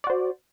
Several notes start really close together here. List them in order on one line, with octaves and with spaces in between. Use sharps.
D5 F#4 C5